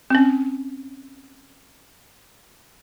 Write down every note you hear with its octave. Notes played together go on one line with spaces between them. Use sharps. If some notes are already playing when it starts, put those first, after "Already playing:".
C4 C#4